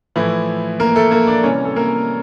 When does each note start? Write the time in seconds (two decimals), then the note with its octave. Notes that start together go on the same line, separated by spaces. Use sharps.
0.16 A2 E3 F3 E4
0.80 A#3 A#4
0.96 A3 A4
1.11 A#3 A#4
1.27 D4 D5
1.43 C3 E3 G3 C#4 C#5
1.65 A4
1.76 A#3 A#4